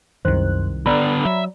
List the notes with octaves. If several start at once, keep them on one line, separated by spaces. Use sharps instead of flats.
C2 F#2 D#3 C5 F#6
D3 B3 D5 A#5 B5
F#3 E5